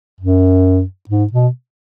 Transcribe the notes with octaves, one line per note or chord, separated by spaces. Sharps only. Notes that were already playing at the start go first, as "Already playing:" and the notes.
F#2
G#2
B2